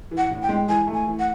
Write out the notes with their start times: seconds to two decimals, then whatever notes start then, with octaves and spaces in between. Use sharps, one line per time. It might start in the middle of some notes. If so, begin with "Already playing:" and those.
0.11 E3
0.17 F#5
0.31 A2
0.42 G5
0.49 G#3
0.68 E3 G#5
0.87 A3
0.94 G#5
1.06 E3
1.19 F#5